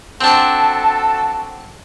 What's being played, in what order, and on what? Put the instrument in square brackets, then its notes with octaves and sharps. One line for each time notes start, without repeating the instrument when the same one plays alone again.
[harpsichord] C4 D4 [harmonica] F#4 A4 [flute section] A5